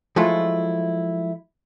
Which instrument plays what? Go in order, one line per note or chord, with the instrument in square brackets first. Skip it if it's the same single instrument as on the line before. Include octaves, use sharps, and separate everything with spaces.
[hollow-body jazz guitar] F3 F#3 G#3 A3 E4 F4